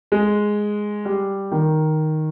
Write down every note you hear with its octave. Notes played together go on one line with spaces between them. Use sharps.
G#3
G3
D#3